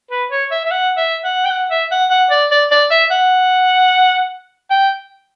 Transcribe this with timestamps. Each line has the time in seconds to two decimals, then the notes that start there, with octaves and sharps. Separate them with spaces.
0.11 B4
0.31 C#5
0.51 E5
0.65 E5
0.71 F#5
0.97 E5
1.24 F#5
1.45 G5
1.50 F#5
1.70 E5
1.91 F#5
2.10 F#5
2.31 D5
2.51 D5
2.71 D5
2.91 E5
3.11 F#5
4.71 G5